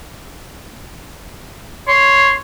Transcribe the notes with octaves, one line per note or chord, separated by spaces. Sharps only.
C#5 C6